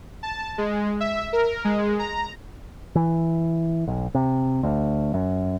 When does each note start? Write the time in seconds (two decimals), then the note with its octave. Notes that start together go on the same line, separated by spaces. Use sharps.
0.23 A5
0.58 G#3
1.00 E5
1.33 A#4
1.65 G#3
1.99 A#5
2.95 E3
3.87 B1
4.15 C3
4.63 D2
5.14 F#2